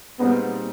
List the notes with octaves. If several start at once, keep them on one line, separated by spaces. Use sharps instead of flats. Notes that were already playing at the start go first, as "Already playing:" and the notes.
A#2 G3 B3 C4 D#4 G#4